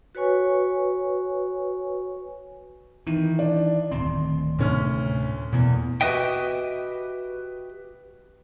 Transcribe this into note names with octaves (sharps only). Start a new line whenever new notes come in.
F#4 B4 C#5 G#5 C#6
D#3 E3
D4
D1 D#3 C4 C6
D2 A2 C3 C#4 F6
E2 B2 A#3
F#4 G4 B4 D#5 E5 G5